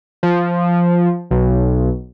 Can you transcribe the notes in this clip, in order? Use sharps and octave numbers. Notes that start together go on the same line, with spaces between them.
F3
B1